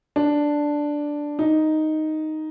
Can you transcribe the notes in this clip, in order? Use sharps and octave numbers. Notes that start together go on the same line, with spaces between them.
D4
D#4